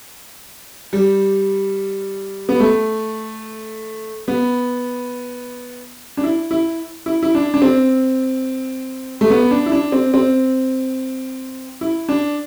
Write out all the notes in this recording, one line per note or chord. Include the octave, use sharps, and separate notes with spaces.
G3
B3
A3
B3
D4
E4
E4
E4
E4
D4
D4
C4
A3
B3
D4
E4
D4
C4
C4
E4
D4